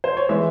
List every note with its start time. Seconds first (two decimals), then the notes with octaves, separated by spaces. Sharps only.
0.04 C5
0.17 C#5
0.29 E3 G#3 E5